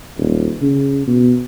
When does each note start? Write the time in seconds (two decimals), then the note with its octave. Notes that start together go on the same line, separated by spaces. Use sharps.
0.18 D#1
0.62 C#3
1.07 B2